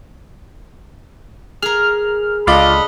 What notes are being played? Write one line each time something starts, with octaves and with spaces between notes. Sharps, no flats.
G#4 A#4 F6
C#2 D3 F4 D5 D#5 F5 B5